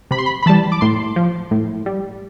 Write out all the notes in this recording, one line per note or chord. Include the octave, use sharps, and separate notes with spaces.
C3 B5
C6
B5
B5
E3 G3 A5
D6
A2 C6
F3
A2
G3